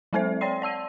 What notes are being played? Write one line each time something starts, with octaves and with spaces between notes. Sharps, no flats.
F#3 G#3 C4 A4 C5 E5
C#5 D5 G5 C6 C7
D5 A5 E6 D#7